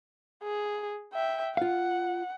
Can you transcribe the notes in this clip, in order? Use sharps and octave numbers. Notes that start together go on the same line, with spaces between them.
G#4
E5 G5
F4 F5 F#5